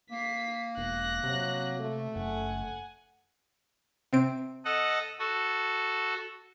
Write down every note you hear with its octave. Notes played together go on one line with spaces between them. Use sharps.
A#3 B6 C7
E1 F#6 A#6
C3 F#3
A3
F#1 F#5 G#5
C3 C4 D7
A4 D#5 F#5
F#4 A4